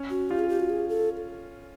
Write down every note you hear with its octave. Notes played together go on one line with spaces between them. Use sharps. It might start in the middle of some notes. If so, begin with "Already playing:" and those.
Already playing: C#4
F#4
F4 G4
G#4
G4
F#4
G#4
A4